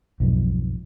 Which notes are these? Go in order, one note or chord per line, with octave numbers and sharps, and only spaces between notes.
B1 F2 G#2